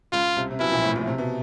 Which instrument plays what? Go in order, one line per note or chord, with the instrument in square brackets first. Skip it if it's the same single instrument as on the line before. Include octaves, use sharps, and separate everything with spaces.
[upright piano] C#2 C#3 [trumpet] F4
[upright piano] C2 C3
C3
[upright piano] B1 B2 [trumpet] E4
[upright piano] A#1 A#2
A1 A2
A#1 A#2
C3
B2